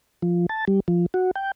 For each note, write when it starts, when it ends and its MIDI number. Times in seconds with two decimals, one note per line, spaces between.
0.22 0.46 53
0.49 0.65 81
0.68 0.80 55
0.88 1.06 53
1.14 1.31 66
1.36 1.51 79